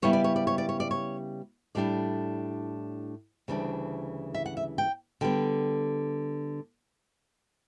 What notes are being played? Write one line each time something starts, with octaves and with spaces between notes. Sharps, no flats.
C#3 G3 B3 E4 C#5
D5
C#5
D5
C#5
D5
C#5
D5
C#5
A2 G3 D4 D5
D2 C#3 E3 G3 D4
E5
F#5
E5
G5
D3 G3 B3 G5